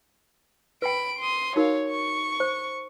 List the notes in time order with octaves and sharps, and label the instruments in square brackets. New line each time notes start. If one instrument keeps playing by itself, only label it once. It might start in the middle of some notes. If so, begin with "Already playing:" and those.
[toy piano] B4 G5 [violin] B5 D7
[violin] C6 D#6
[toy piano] D#4 F#4 A#4 [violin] C#5 F5
[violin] C#6
[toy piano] C5